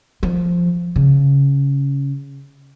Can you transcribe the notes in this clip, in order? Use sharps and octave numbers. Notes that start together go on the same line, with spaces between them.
F3
C#3